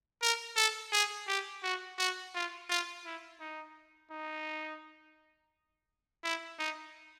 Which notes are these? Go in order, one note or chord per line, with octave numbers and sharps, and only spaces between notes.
A#4
A4
G#4
G4
F#4
F#4
F4
F4
E4
D#4
D#4
E4
D#4